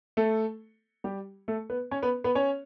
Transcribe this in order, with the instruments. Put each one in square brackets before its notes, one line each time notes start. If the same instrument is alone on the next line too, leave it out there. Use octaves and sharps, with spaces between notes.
[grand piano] A3 A4
G3 G4
A3 A4
B3 B4
C#4 C#5
B3 B4
B3 B4
C#4 C#5